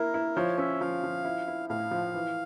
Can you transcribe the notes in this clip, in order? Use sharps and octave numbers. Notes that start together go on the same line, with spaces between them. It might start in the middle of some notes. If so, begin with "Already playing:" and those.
Already playing: A#3 E4 A#4
E4
F3 C#5
C#4 E5
F3 F5
F3
E4
E4
A2 F5
F3
E3